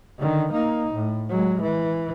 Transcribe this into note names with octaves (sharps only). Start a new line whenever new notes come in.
D3 D#3
A#3 D#4
A2
F#3 G#3
E3